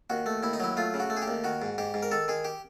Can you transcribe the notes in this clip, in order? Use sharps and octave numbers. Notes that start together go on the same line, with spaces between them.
D#2 F#4
A3
D#2 E4
D#4
F#3 E4
A3 F4
C#3
F#4
A3
G#4
G4
D#2
D#3 F#4
G#2
G#2 G4
G#2
A#4
D#3 A4
D#3 G#4
G4